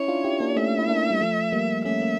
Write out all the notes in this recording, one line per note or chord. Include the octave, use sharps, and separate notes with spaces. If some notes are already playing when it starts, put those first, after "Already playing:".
Already playing: C#4 E4 C#5
D4 F4
E4 G4
A#3 D4
A3 C#4 E5
E4
A#3 D4
G3
F3 A3
G3 A#3
A3 C#4 E5
A#3